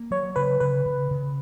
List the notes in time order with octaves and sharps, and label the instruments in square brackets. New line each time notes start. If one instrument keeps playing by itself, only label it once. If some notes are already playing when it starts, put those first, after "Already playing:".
Already playing: [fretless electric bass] A#3
[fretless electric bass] F#3 [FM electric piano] C#5
[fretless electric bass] C#3 [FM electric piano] B4
[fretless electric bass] C#3 [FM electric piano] B4
[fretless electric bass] C#3
C#3